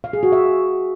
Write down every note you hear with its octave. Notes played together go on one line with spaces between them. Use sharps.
F5
G#4
F#4
E5